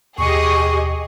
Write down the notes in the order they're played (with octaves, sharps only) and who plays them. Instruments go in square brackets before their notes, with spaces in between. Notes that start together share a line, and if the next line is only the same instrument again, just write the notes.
[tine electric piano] D#2 B2 [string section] G4 G#4 D#5 [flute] C#6